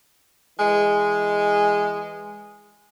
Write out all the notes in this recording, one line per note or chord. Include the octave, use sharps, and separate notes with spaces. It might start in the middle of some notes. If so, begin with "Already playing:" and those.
E3 G#3